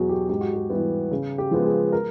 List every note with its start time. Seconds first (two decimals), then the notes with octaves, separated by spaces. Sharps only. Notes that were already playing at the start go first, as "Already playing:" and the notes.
Already playing: E2 B2 F#3 F#4 G#4
0.09 G4
0.29 G#2 G4
0.41 F#4
0.53 G4
0.70 E3 G3 B3
1.11 C#3
1.38 G4
1.51 F3 G#3 B3 G4
1.66 G#4
1.92 A#4